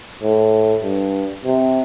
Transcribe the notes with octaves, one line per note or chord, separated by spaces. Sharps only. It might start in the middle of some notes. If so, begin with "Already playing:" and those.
A2
G2
C3